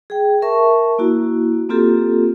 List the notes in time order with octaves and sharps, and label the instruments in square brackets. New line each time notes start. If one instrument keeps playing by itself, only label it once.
[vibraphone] G#4 G5
A#4 E5 A5 C#6
A#3 E4 F#4
A#3 C4 F4 G4 A4